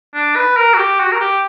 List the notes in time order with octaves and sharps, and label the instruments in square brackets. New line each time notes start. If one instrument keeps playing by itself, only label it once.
[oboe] D4
B4
A#4
F#4
G4
F#4
A#4
G4